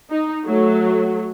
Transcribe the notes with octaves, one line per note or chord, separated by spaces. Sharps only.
D#4
F#3 A3